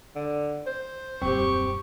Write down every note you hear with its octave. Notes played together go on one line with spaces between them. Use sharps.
D3
C5
D#1 F#2 C4 G4 C#6